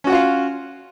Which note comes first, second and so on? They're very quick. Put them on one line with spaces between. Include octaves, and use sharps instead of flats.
C#4 F#4 F#5 F4 F5